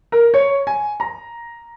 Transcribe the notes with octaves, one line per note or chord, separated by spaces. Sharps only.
A#4
C#5
G#5
A#5